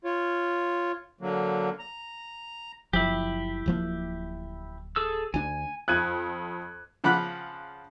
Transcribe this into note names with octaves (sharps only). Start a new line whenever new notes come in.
F4 C#5
D3 F#3 A#3
A#5
F#1 F3 E4 G4
D1 F3 A#3
G#4 A4 E6
D2 D4 G#5
F2 F#6 G#6 D#7
C#3 F3 F#5 B5 D6 F#6